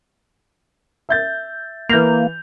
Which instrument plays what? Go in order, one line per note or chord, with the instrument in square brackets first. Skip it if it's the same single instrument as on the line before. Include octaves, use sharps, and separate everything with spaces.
[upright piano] E5 G6 A6
[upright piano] E3 G6 F7 [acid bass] A#3